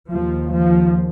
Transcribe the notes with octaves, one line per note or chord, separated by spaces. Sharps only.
D#2 F3
F3